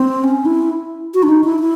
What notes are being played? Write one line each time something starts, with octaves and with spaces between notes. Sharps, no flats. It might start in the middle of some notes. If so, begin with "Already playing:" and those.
Already playing: C4
C#4
E4
F#4
D4
D#4
E4
E4